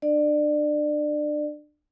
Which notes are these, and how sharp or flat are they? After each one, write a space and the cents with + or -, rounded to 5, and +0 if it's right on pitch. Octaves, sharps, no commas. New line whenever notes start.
D4 +30 D5 +25